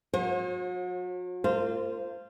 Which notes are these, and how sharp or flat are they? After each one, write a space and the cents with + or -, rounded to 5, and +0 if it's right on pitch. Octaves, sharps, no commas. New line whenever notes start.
F#3 -40 C5 +45
A#3 -35 F4 -15 C5 +0